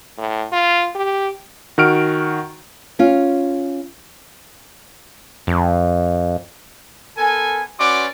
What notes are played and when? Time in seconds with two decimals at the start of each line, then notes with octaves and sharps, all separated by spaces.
0.18 A2
0.52 F4
0.95 G4
1.78 D#3 F#4 F6 D7
2.99 C#4 F4
5.47 F2
7.17 B3 A4 A#4 G#5
7.80 C#4 F#4 B4 D5 C6 D6